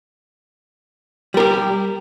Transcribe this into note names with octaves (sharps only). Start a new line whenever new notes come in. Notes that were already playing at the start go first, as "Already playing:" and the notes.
G3 G4 A#4